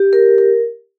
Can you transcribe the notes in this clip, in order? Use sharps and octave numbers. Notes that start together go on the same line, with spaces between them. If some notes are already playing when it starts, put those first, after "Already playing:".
Already playing: G4
A#4
A#4